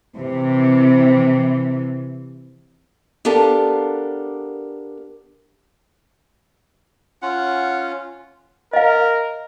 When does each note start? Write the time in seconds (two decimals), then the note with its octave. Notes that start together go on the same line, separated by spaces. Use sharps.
0.17 C3 E3
3.25 B3 D4 G4 A4 A#4 F5
7.22 C#4 F4 F#5
8.73 A#4 D#5 F5